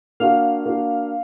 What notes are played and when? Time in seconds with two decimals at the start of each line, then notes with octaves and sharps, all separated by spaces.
0.20 A#3 D4 F#4 F5
0.66 A#3 D4 F#4